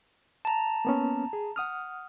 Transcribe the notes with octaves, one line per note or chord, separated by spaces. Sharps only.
A5 A#5
A#3 B3 C#4
G#4
F#5 D#6 F6